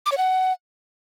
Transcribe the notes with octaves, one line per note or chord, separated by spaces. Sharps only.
D6
C#5
F#5